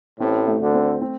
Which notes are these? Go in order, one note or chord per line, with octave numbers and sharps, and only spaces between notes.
A1 A2 C4
A3
D2 D3
C4
C4